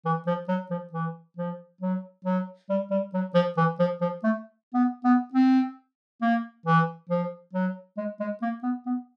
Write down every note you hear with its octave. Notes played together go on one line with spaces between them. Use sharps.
E3
F3
F#3
F3
E3
F3
F#3
F#3
G3
G3
F#3
F3
E3
F3
F3
A3
B3
B3
C4
A#3
E3
F3
F#3
G#3
G#3
A#3
B3
B3